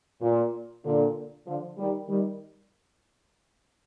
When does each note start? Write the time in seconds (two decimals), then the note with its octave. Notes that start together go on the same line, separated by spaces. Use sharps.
0.22 A#2
0.84 A#2 D3
1.47 D3 F3
1.78 D#3 G3
2.09 D#3 G3